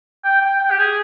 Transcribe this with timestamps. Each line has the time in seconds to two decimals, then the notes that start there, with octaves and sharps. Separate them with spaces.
0.24 G5
0.41 G5
0.60 G5
0.70 G4
0.79 G#4